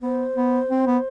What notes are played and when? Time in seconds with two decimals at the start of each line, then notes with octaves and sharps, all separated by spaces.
0.02 B3 C5
0.36 B3
0.70 C4
0.86 B3